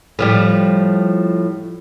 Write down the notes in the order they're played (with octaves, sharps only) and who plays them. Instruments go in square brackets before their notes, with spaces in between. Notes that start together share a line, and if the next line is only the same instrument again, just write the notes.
[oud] A2 F3 G3